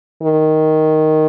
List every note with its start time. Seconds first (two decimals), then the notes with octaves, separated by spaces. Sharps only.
0.23 D#3